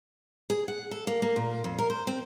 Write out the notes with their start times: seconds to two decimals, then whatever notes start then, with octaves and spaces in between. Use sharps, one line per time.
0.50 G#4
0.68 F#5
0.91 A4
1.07 A#3
1.22 A#3
1.36 A#2
1.64 F2
1.78 A#4
1.90 C5
2.07 C4